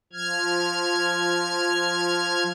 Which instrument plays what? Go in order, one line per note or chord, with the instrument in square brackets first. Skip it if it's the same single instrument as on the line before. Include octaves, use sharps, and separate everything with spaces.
[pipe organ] F3 F6 G#6